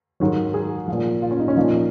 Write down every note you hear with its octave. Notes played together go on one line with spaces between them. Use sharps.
G#2 D#3 F#3
G#4
A#2 F3
F4
C#4
D#4
C#4
A#2 F3 D#4